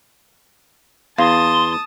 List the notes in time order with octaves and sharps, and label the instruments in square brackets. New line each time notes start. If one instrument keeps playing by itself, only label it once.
[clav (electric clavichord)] E2 [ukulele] F5 [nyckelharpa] A5 D#6 [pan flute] C6